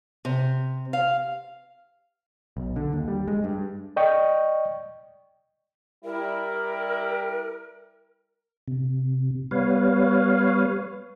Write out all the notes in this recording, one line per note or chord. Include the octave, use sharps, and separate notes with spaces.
C3
F5
B1
D3
D#2
G3
G#3
G2
D5 D#5 G5 C#6
G3 E4 A#4
C3
G3 B3 B4 C#5 F5